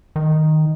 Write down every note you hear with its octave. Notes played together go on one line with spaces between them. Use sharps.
D#3